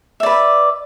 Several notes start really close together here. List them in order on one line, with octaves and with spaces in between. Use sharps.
E5 D5 B4